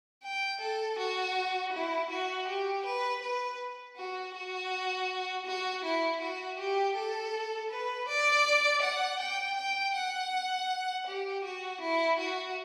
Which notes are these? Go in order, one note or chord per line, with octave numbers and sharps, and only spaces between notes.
G5
A4
F#4
E4
F#4
G4
B4
B4
F#4
F#4
F#4
E4
F#4
G4
A4
B4
D5
F#5
G5
G5
F#5
G4
F#4
E4
F#4